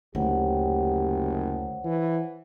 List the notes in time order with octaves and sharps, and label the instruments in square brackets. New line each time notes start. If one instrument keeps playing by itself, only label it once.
[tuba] F#1 [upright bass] D2 [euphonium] G4 [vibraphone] C5 C#5 F#5
[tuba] E3